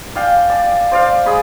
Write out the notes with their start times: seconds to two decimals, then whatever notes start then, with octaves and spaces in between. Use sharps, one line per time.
0.15 D5 F5 G5 G#5
0.50 D5 G#5 A5
0.92 C5 D5 F5
1.26 G#3 G#4 B5 D#6